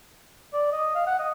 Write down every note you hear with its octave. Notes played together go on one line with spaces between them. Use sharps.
D5
D#5
F5
F#5
D#5